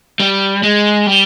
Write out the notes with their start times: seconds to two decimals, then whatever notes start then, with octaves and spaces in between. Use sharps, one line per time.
0.20 G3
0.63 G#3
1.07 G3